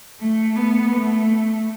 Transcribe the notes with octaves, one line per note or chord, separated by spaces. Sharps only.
A3
B3
A3